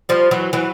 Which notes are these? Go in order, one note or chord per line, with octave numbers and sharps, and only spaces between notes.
F3 G3
E3 F#3
E3 F#3